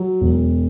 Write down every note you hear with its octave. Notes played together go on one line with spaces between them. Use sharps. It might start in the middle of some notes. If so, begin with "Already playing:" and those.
Already playing: F#3
E1